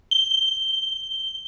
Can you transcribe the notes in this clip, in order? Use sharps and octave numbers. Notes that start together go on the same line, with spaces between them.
G7